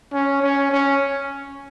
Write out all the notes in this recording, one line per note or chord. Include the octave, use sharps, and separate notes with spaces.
C#4
C#4
C#4